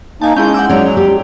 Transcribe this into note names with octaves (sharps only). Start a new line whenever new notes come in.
A#3 D#4 G#5 A5
G#3 C#4 E4 G#4 G6
F#5 D6 E6
F#3 G#3 C#4 G#4 D5 F7
G4